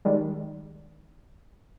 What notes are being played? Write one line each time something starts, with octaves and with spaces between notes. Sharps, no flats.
D#3 G3 G#3